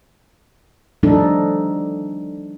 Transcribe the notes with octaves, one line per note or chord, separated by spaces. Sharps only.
F3 G3 A3 D4 D#4 A4